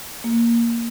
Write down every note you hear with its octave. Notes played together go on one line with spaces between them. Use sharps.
A#3